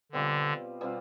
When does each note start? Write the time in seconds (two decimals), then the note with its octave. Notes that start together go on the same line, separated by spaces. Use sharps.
0.12 B2 D3 G3 C4 F4
0.81 B2 G3 C4 F4